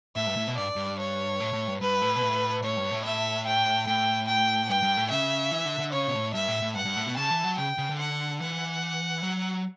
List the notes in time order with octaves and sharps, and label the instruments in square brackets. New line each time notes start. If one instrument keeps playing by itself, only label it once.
[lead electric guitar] A2 [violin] E5
[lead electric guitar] G2
A2
B2
[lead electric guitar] G2 [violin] D5
[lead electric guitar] G2
[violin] C#5
[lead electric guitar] A2
A2
G2
[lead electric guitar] G2 [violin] B4
[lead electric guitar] A2
B2
A2
[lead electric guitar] A2 [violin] C#5
[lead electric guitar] G2
A2
[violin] E5
G5
[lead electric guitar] A2 [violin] G5
[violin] G5
[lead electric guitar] G2 [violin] G5
[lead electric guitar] G2
A2
[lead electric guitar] C#3 [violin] E5
[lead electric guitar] E3
D3
D3
[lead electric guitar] C#3 [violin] C#5
[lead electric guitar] B2
A2
[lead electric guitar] G2 [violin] E5
[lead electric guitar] A2
A2
[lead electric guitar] G2 [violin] F#5
[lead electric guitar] G2
A2
B2
[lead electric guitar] C#3 [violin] A5
[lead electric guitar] E3
F#3
[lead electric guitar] C#3 [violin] G5
[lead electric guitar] C#3
D3
[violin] F#5
[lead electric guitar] E3 [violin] F#5
[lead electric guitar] F#3